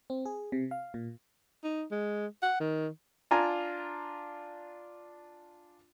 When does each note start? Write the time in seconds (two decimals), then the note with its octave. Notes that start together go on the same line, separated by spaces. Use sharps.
0.10 C4
0.25 G#4
0.52 C3
0.71 F5
0.94 A#2
1.64 D#4
1.91 G#3
2.42 F#5
2.60 D#3
3.31 D4 F4 G#5 A#5